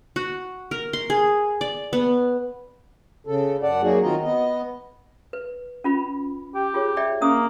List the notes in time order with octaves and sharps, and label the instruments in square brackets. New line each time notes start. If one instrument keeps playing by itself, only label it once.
[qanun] F#4
A#4
C6
G#4
D5
B3
[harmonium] C#3 A4
F#2 D5 F#5 A5
F#3 A#3 D#4 F#4 G#4
D#3 C4 F4 F#4 D#5 A#5
B3 D#5
[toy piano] B4
C#4 F4 B5
[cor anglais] G4
[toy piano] F4 G#4 C#5
D5 E5 G5
[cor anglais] A#3 [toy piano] C#4 D#6